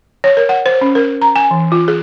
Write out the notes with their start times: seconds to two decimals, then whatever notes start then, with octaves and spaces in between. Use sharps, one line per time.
0.24 C#5
0.37 A#4
0.49 F#5
0.66 C5
0.81 C#4
0.95 A#4
1.22 A#5
1.36 G#5
1.51 E3
1.72 F4
1.88 G#4